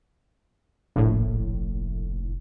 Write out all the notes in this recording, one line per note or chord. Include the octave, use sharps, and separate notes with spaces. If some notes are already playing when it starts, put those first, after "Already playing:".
F1 A#1 A2